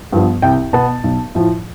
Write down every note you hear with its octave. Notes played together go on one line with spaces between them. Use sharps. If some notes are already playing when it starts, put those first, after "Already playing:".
G2 F3 B3
C2 G5
B2 B3 A5
B1
A2 F3